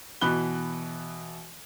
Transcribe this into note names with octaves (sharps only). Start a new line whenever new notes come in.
B2 E3 B5 F#6 G7